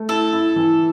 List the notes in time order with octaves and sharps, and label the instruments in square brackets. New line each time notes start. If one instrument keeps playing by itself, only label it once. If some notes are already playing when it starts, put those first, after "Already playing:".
Already playing: [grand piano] A3
[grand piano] E4 [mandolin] A4
[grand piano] E4
E3